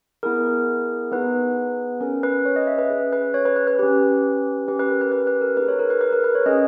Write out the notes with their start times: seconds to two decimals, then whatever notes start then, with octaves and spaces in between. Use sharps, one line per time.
0.23 B3 E4 G#4 A#4
1.12 B3 D#4 G#4 B4
2.01 C#4 G#4 A#4
2.23 B4
2.45 C#5
2.56 D#5
2.67 E5
2.79 B4
2.90 C#4 G#4
3.13 B4
3.34 C#5
3.45 B4
3.56 B4
3.67 B4
3.79 C#4 G4 B4
4.68 C#4 G4 B4
4.80 B4
4.90 A#4
5.01 B4
5.12 B4
5.27 B4
5.41 A#4
5.57 A#3 D#4 G#4 B4
5.68 C#5
5.79 A#4
5.90 B4
6.01 B4
6.13 A#4
6.24 B4
6.35 C#5
6.46 C#4 G#4 D#5